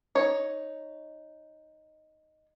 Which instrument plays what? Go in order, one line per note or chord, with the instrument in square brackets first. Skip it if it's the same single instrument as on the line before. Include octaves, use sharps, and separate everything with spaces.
[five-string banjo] D#4 C#5